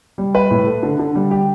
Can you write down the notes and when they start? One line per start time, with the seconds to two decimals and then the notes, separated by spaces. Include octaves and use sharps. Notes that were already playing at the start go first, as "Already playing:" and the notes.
0.18 G3
0.35 B4
0.51 A2
0.67 A3
0.83 D3
0.99 D3
1.15 G3
1.31 G4